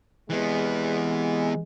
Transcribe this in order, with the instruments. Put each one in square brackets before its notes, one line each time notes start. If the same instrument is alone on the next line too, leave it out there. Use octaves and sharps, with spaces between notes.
[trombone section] C3 G#3 [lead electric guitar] E3 B3